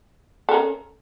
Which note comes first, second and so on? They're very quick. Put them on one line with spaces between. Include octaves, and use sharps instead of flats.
A4 A#4 C#4